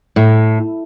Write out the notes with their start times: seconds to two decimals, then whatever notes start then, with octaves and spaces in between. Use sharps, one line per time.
0.16 A2